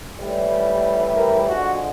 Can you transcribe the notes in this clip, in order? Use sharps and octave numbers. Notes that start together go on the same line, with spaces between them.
A2 E3 G3
A#4
D3 F3 G#3 F#4